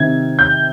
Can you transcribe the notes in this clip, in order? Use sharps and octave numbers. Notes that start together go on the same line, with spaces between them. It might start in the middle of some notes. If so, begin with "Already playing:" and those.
Already playing: C3 D#3 G#6
G6